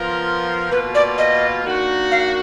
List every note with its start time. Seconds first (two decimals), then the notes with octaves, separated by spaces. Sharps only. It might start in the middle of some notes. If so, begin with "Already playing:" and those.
Already playing: F3 B3 F4 A#4
0.71 B2 A#3 F4 B4
0.95 D5
1.18 D#5
1.64 D#3 A#3 D4 F#4
2.12 F5